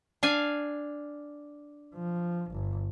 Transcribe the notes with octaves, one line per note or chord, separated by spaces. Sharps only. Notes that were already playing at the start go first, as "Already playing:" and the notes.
D4 F5 G#5
F3
G1